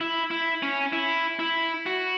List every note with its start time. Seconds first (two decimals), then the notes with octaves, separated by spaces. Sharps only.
0.01 E4
0.31 E4
0.63 C#4
0.93 E4
1.39 E4
1.86 F#4